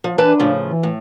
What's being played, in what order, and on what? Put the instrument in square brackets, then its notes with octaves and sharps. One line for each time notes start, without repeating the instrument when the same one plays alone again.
[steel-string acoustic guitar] F3
[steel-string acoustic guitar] E3 B4 A5 [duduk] D4
[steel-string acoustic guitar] A2 C#3 F3
[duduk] E3
[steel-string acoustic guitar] A2